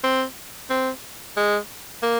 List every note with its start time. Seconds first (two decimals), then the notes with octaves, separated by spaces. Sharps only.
0.04 C4
0.70 C4
1.37 G#3
2.03 A#3